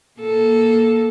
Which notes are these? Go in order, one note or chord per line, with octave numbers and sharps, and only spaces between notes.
A#3 A4